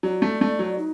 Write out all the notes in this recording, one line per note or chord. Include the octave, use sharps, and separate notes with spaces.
F#3 D5
A3
A3
F#3
D#4